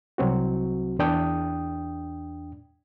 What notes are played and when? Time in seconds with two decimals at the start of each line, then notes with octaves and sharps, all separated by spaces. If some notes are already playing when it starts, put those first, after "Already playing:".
0.18 C2 F#3 C4 F#4
0.99 E2 D4 G5 D#6